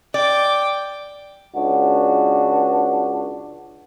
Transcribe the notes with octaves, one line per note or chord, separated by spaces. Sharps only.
D5 G5 D6
C#2 D4 F#4